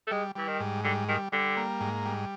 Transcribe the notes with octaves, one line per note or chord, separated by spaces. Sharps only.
A3
G3 G#3
E3 G3
D#3
G#2
D3 G3
D#3 G3
D3 G3
A#3
G#2
G3